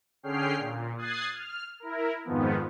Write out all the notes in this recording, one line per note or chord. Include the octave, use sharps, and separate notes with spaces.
D3 C#4 G#4 G5 F6 C7
A#2
D#6 F#6 G#6 A6 C7
F6
E4 A#4
F2 G#2 D#3 F3 B3